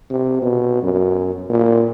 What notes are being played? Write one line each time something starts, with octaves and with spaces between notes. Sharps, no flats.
C3
B2
F#2
A#2